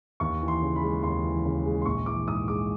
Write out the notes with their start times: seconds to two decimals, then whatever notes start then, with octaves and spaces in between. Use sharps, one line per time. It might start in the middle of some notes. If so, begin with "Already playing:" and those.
0.20 D#2 C#6
0.41 E3
0.48 C6
0.62 C#3
0.76 B5
0.83 G#3
1.03 D#2 C6
1.24 E3
1.45 C#3
1.66 G#3
1.82 C6
1.86 A#1 C#6
2.06 E3 D6
2.27 G#2 D#6
2.48 G#3 D6